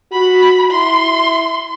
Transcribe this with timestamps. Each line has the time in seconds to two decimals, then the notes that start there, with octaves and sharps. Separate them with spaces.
0.12 F#4 B5
0.71 E4 C6